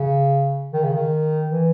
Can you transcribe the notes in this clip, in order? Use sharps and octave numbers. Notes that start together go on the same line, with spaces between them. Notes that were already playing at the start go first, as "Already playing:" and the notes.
Already playing: C#3
D#3
C#3
D#3
E3